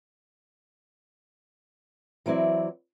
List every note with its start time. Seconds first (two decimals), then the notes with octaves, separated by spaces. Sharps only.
2.26 E3 F#3 C4 E4 D5